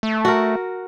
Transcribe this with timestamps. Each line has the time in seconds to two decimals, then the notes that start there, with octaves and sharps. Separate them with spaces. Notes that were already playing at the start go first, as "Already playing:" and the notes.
0.03 A3
0.25 F#4 A#4